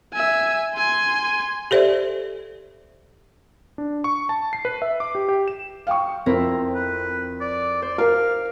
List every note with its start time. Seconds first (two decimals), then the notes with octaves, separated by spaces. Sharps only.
0.13 E5 G#5
0.75 G#5 C6
1.71 G4 A4 C5 D5 E5
3.78 D4
4.04 C#6
4.29 A5
4.53 C7
4.65 B4
4.82 E5
5.00 D6
5.15 G4
5.29 G4
5.48 E7
5.87 F5 G5 C#6
6.26 F2 C4 E4 A#4
6.75 B4
7.41 D5
7.82 C5 D5
7.98 A#4 F5